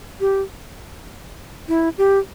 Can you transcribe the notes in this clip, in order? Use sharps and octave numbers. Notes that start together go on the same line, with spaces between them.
G4
E4
G4